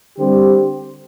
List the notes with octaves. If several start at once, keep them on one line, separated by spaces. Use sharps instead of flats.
D3 G3 C4 G4 C5